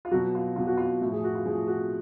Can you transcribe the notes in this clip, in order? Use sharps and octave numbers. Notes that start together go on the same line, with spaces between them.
F4
B2 F#3 F#4
F4
B2 F#3 F4
F#4
F4
A2 F3 F#4
G#4
F#4
F4
A2 F3 G#4
F#4